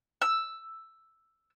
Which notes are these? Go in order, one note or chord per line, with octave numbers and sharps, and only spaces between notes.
E6